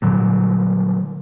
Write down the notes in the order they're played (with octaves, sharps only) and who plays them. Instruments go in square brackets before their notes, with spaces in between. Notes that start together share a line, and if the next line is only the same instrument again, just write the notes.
[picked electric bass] A#2 D3 F#3 G3